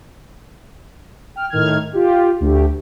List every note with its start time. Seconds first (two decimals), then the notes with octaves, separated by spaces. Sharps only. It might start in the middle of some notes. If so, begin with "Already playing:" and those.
1.36 G5 F6
1.50 A2 D#3 F6 G#6
1.93 F4 G4
2.40 D2 G4